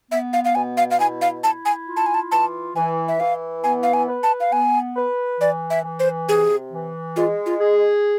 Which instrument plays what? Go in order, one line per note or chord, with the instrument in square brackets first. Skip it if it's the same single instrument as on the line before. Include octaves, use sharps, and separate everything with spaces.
[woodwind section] B3 [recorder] E5
[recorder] F5
F5
[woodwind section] B2 [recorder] G#5
[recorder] F5
F5
[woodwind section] E4 [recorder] G#5
[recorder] F5
[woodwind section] E4 [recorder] A5
[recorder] G#5
[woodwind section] F4
[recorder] A5
G#5
A5
[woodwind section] E3 [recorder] A5
[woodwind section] E3 [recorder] G#5
[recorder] E5
[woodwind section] E3 [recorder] F5
[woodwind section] B3 [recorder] G#5
[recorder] F5
G#5
[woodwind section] B4
[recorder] A5
F5
[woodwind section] B3 [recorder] G#5
[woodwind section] B4
[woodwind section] E3 [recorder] D5
[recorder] E5
[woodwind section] E3
[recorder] C5
[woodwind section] C3 [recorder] G#4
[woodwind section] E3
[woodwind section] G#3 [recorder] F4
[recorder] F4
[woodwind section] G#4